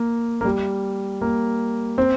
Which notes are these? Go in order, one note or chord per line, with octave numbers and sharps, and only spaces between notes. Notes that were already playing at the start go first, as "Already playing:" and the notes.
Already playing: A#3
A#3
G3
A#3
C4